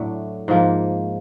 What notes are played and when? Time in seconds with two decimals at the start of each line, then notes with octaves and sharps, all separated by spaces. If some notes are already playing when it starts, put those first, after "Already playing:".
Already playing: A2 F#3 A3 D4
0.48 G#2 F3 A#3